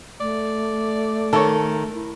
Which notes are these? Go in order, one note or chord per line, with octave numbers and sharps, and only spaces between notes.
A3 D5
D#3 A4 C#5
E4